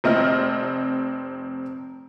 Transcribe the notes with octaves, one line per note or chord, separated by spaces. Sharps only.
F1 C4 D#5 F6